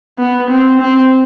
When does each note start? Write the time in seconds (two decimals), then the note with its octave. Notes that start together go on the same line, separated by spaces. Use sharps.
0.19 B3
0.49 C4
0.81 C4